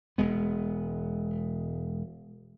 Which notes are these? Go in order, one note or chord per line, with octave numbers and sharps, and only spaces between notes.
E1 G#3 B3